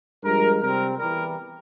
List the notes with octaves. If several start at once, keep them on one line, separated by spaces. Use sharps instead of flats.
G2 F3 G#3 A#4
C3 G3 C4 A#4
E2 E3 G3 A#4